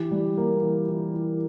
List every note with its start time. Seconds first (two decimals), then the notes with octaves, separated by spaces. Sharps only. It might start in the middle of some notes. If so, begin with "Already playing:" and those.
Already playing: E3 G4
0.11 G3
0.38 A#3
0.63 E3
0.88 E3
1.14 E3